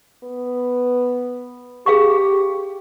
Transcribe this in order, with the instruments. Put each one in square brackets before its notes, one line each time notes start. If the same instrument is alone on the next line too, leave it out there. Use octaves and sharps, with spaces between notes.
[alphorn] B3
[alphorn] G4 [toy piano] G#4 F5 C#6